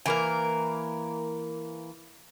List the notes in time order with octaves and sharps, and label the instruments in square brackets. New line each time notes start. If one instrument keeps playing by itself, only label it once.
[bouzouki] E3 A#3 A#4